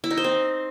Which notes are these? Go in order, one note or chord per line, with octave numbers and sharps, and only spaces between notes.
E4
D#4
C5
C4